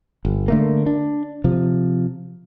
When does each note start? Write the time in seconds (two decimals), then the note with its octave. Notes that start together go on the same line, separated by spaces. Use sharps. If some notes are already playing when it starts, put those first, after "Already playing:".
0.25 G1
0.48 D3 A3 A#3
0.86 D4
1.44 C3 F3